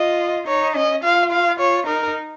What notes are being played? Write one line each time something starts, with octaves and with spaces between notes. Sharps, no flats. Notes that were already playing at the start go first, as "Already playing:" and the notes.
Already playing: F4 D#5
D#4 C#5
C#4 D#5
F4 F5
F5
F4 C#5
D#4 A#4